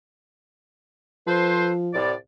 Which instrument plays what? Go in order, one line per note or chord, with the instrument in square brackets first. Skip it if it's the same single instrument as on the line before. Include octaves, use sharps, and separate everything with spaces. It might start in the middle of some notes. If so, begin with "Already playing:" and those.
[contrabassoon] F3 [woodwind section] A4 B4 C5
[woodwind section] C2 A2 D5